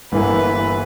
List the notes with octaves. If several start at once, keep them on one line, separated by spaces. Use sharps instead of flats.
G1 G2 E3 A#3 E4 B4